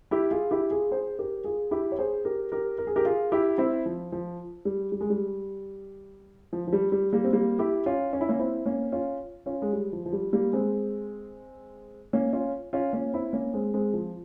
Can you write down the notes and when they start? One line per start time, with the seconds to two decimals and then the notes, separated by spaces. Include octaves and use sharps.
0.11 E4 G4
0.31 F4 G#4
0.51 E4 G4
0.71 F4 G#4
0.91 G#4 C5
1.18 G4 A#4
1.44 F4 G#4
1.71 E4 G4
1.92 C#5
1.99 G#4 C5
2.25 G4 A#4
2.52 G4 A#4
2.78 A#4
2.87 G#4
2.96 G4 A#4
3.05 F4 G#4
3.32 E4 G4
3.58 C4 E4
3.86 F3
4.12 F3
4.65 G3
4.92 G3
5.01 G#3
5.10 G3
6.53 F3
6.67 F3
6.73 G3
6.92 G3
7.13 G3 A#3
7.24 C4
7.33 G3 A#3
7.59 E4 G4
7.86 C#4 F4
8.13 C#4
8.21 E4
8.28 A#3 C#4
8.39 C4 E4
8.66 A#3 C#4
8.92 C#4 F4
9.46 C#4 F4
9.62 G#3
9.73 G3
9.93 F3
10.06 F3
10.13 G3
10.33 G3 A#3
10.53 G#3 C4
12.13 A#3 C#4
12.33 C#4 F4
12.73 C#4 F4
12.93 A#3 C#4
13.13 C4 E4
13.33 A#3 C#4
13.54 G#3 C4
13.74 G#3 C4
13.94 F3